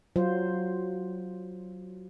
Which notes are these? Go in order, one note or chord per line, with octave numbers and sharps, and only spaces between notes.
F#3 F4 C5